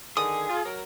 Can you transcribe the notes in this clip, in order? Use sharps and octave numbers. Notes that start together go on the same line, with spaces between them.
D3 D#3 G#4 D#6
F4
F#3 A#4